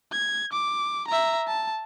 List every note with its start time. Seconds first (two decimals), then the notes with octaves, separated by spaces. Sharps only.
0.12 G#6
0.52 D6
1.07 E5 A#5
1.48 A5